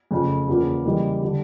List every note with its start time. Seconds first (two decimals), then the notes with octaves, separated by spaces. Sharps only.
0.11 F2 C#3 F3 A3
0.48 E2 C#3 F3 A#3
0.85 C#3 E3 G3 A#3 D#4
1.22 D3 G3